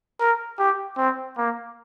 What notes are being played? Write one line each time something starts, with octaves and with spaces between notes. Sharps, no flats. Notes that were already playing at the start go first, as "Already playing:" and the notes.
A#4
G4
C4
A#3